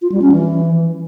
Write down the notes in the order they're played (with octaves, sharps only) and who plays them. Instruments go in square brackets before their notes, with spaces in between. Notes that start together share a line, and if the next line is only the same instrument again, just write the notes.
[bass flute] F4
G3
C#4
E3